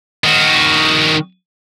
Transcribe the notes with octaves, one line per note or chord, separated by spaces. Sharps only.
D#3 F#4